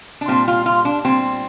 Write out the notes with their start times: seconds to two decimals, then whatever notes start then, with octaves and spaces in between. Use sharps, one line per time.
0.21 D4
0.28 A#2 G3 C4
0.48 F4
0.66 F4
0.85 D4
1.05 A#2 G3 C4